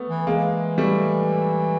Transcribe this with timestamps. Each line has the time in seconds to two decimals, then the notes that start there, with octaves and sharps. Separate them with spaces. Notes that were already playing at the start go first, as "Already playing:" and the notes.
Already playing: A3 B3
0.09 E3
0.27 E3 G#3 A#3
0.78 G3 A3